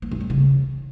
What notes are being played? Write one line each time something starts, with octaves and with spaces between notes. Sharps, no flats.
A#3
F#2
F2
C#3